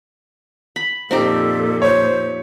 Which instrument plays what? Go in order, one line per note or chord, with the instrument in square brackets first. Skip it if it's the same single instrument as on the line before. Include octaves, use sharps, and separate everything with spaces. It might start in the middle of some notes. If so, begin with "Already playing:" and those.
[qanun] B5
[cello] F2 A#2 [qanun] C4 D#4 G4 [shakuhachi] A4
[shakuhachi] C5 [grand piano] C#5